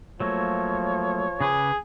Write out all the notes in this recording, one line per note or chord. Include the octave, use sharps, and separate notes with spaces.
F3 F#3 A3 A#3 C#5
C#3 G#4 B4 D6